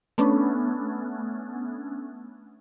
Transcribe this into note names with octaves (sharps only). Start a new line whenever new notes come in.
A3 B3 C#4 D4